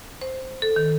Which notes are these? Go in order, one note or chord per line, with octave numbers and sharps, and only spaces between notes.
C5
A4
D#3